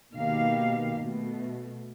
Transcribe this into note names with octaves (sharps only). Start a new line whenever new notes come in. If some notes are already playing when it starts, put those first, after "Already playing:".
B2 D#3 A#3 G4 F5
B2 A3